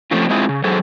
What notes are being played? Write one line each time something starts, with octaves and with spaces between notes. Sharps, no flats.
F3 A3 C4 C#4 F4
G#3 C4 E4 F4 G#4
C#3
F#3 G#4 A4 C5